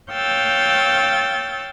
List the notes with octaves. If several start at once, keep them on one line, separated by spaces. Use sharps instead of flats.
C#5 F5 G5 E6 G6 A6